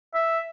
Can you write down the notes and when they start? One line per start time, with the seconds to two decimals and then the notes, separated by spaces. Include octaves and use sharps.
0.14 E5